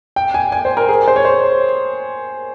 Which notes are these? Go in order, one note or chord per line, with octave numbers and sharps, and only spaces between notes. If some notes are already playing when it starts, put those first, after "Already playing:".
G5
G#5
G#5
C5
A#4
G#4
C5
C#5
C5